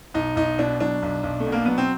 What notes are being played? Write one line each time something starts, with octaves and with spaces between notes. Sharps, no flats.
B1 D#4
B1 D#4
B2 D4
F#3 D4
B1
B1
A3
B2
A#3
F#3 B3
C4